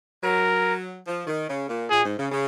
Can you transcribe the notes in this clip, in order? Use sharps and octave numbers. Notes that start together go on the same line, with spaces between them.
F#3 A#4
F3
D#3
C#3
A#2
A#2 G#4
G#2
C#3
C#3